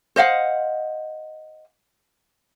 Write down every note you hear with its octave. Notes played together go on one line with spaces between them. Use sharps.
C5 D#5 F5 F#5